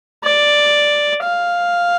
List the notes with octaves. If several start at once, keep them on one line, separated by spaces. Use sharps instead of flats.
D5
F5